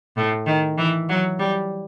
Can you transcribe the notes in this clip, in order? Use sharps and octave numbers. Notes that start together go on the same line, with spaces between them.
A2
D#3
E3
F#3
G3